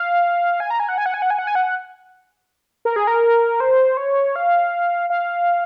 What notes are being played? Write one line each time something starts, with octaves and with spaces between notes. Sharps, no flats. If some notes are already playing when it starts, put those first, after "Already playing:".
Already playing: F5
G#5
A#5
G#5
F#5
G#5
F#5
G#5
F#5
G#5
F#5
G#5
F#5
A#4
G#4
A#4
C5
C#5
F5
F5